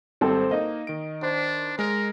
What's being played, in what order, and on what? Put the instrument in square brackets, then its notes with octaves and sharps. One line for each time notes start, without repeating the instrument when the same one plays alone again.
[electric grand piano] G#1 G3 [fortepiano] C4 A4 C5
[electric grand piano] A#3 D#4 [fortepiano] D#5
[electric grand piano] D#3 D7
[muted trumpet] D4 [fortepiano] C5
[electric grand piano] G#3 [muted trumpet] A#4